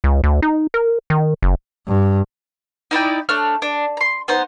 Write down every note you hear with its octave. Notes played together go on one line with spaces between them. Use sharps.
C#2
D2
D#4
A#4
D#3
F#1
G2
D#4 E4 D5 G5
A3 D4 C#5 F6
D4
A#5 C6
B3 D#4 C5